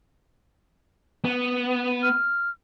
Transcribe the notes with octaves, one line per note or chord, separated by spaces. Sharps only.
B3
F6